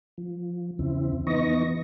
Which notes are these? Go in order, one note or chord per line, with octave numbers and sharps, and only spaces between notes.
F3
E2 C#3 C4 E4
E3 B3 D#4 D#5 C#6 A#6